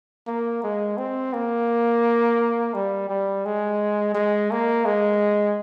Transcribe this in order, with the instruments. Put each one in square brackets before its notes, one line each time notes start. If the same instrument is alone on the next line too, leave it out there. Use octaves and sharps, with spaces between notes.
[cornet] A#3
G#3
C4
A#3
G3
G3
G#3
G#3
A#3
G#3